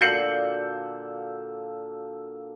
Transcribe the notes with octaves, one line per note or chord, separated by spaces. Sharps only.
A#2 D3 F#4 F5 E6 G6 C#7 F#7